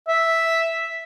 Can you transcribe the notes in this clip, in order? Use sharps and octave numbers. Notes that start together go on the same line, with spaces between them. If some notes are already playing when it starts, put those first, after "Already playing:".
E5